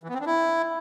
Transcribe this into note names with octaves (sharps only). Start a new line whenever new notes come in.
E3
B3
C4
D4
E4